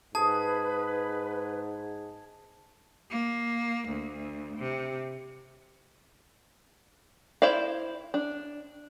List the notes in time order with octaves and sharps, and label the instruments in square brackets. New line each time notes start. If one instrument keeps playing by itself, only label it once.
[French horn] G#2 [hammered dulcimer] G#4 [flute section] B4 [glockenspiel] A5
[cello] A#3
D2
C3
[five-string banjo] E4 C5 D5 F5
D4